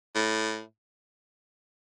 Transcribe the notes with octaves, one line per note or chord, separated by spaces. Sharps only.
A2